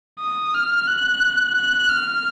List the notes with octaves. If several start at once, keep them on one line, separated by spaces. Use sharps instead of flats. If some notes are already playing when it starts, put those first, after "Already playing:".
D#6
F6
F#6
F#6
F6